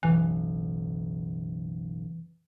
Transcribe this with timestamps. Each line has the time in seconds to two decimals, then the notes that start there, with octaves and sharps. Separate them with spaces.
0.03 F#1 B1 E3